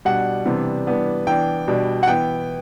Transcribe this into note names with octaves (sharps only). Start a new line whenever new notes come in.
B2 G3 D4 F#5
C3 E3 G3 B3 D4
E3 G3 B3 D4
E3 B3 D4 G5
B2 G3 D4
F#5
E3 B3 E4 G5